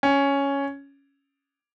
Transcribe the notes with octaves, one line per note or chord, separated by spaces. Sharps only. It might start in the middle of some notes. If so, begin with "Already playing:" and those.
C#4